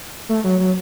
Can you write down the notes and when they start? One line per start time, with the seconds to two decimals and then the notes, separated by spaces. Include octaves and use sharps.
0.29 A3
0.44 F#3
0.60 F#3